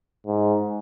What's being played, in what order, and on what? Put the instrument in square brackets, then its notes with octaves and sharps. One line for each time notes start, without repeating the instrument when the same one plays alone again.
[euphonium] G#2